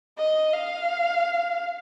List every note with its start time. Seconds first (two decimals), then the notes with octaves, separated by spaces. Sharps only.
0.18 D#5
0.53 F5